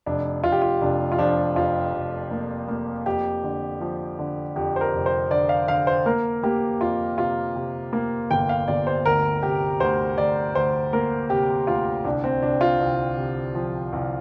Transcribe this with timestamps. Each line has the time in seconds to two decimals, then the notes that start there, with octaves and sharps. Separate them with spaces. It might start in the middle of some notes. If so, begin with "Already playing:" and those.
0.06 F1 D4
0.44 F1 F4
0.52 G4
0.62 F4
0.81 F1 D4
1.12 F4
1.19 F3 D4
1.56 F2 F4
1.93 F1
2.31 A#3
2.68 A#3
3.06 F2 G4
3.44 D3
3.81 F3
4.19 D3
4.56 F2 G4
4.76 C5
4.81 A#4
4.93 F1
5.06 C5
5.30 D3 D5
5.49 F5
5.68 D3 F5
5.87 C5
6.06 A#3 A#4
6.43 A#3 G4
6.81 F2 F4
7.18 C3 F4
7.56 C3
7.93 A#3
8.31 G1 G5
8.49 F5
8.68 G1 D5
8.87 C5
9.05 D2 A#4
9.43 C3 G4
9.80 D2 C5
10.18 D2 D5
10.55 D2 C5
10.93 A#3 A#4
11.30 C3 G4
11.67 D2 F4
12.05 C2 D4
12.24 C4
12.43 C2 D4
12.61 F4
12.80 C2
13.17 C3
13.55 F3
13.93 C2